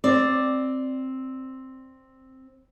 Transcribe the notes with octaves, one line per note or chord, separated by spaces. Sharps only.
C4 D5